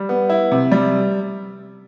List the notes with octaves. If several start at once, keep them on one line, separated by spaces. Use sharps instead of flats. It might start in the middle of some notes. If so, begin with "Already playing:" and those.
Already playing: G3
B3
E4
C3
G3